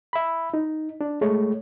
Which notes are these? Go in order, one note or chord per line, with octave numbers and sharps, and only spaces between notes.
E5 B5
D#4
D4
G#3 A3 C#5